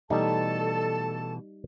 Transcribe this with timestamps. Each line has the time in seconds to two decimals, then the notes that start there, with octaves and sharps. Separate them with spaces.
0.10 B2 E3 G3 A3 D#4 A4 A5